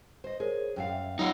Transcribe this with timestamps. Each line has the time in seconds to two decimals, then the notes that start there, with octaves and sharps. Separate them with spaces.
0.24 C5 D#5
0.40 G#4 A#4 C5 C#5
0.76 F#2 G#4 F5 G5
0.89 E5 G5
1.19 F#3 D#4 F4 F#5